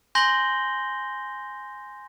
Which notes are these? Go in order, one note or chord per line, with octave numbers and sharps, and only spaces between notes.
G#5 C6 G6 A#6 F#7 G7